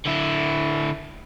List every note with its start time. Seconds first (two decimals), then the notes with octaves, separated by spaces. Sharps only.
0.06 D3 E4